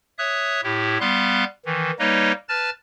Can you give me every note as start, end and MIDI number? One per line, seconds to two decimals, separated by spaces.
0.18 0.61 73
0.18 0.61 76
0.18 0.61 87
0.18 0.61 90
0.63 0.98 45
0.63 0.98 64
0.63 0.98 67
1.00 1.44 55
1.00 1.44 59
1.00 1.44 77
1.00 1.44 84
1.00 1.44 90
1.66 1.91 51
1.66 1.91 52
1.99 2.32 55
1.99 2.32 58
1.99 2.32 63
1.99 2.32 71
1.99 2.32 73
1.99 2.32 75
2.49 2.70 71
2.49 2.70 81
2.49 2.70 89
2.49 2.70 93